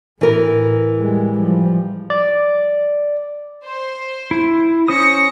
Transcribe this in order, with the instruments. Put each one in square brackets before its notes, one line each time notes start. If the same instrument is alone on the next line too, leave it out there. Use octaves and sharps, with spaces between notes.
[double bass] A2 [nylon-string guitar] E3 A#4
[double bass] G3 G#3
F3 G3
[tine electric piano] D5
[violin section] C5
[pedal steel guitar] E4
[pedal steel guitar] C#4 C5 D#6 [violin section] A#6 C#7